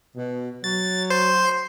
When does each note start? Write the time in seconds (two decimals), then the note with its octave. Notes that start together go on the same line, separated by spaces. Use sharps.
0.16 B2
0.64 F#3 A6
1.10 C5